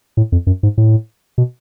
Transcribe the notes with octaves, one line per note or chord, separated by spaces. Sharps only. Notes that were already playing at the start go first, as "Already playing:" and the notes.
A2
F2
F#2
G#2
A2
B2